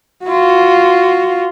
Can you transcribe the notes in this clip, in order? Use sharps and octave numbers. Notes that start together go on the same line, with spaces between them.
F4 F#4